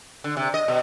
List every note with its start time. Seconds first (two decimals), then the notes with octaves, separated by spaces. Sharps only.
0.24 D3
0.37 C3
0.54 D#5
0.68 B2